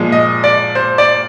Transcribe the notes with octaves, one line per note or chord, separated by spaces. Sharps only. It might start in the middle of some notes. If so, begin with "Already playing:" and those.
Already playing: A#2 F3 G#3
D#5
D5
C5
D5